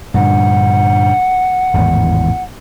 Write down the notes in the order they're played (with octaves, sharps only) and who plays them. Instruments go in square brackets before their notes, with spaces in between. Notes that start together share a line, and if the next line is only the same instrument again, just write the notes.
[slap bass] G2 A#2 D3 [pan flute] F#5
[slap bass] G#1 E2 A2